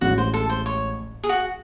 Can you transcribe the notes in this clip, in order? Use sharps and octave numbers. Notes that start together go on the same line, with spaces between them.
A1 A2 G#3 F#4
C5
A4
C5
C#5
G#4
F#4